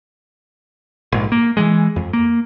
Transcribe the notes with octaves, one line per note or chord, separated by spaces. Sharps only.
A#1 G#2
A#3
E3 F3 G#3
F2
A#3